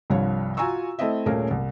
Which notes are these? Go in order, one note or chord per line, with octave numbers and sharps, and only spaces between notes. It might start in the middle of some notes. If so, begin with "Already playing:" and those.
C2 G2 F3 C#5
F4 F#4 G#5 A#5 C#6 E6
A3 C4 E4 D#5 E5
D#1 A#2 A3 C#4 G#4 A#4
C2